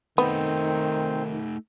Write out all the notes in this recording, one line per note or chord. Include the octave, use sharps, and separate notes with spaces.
D#3 A3 B3 C4 D#4